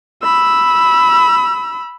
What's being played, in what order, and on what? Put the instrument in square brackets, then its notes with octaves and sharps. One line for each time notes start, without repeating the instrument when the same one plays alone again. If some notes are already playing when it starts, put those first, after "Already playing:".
[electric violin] B5 E6